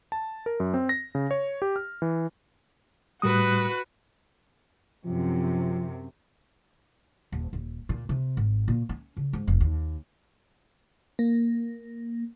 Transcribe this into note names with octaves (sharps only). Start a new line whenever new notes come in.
A5
A#4
F#2
C4
A#6
C#3
C#5
G4
F6
E3
A2 G3 F#4 B4 D#6
F#2 C3 F3
D#1
D#1
A#2
C3
G#1
A#2
C#4
C#3
G#2
F1
D#2
A#3